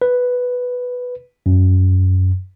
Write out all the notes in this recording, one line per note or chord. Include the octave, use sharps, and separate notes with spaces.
B4
F#2